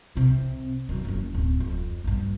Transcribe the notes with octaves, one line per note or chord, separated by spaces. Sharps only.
C2 C3
D#3 F#3
F#1 F#2
D1
F2
A#1 G2